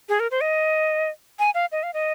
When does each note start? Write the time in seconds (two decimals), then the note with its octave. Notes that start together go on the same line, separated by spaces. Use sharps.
0.09 G#4
0.20 A#4
0.31 C5
0.41 D#5
1.39 G#5
1.54 F5
1.72 D#5
1.83 F5
1.94 D#5